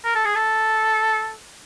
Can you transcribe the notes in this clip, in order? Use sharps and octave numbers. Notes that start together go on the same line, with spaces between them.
A#4
A4
G#4
A4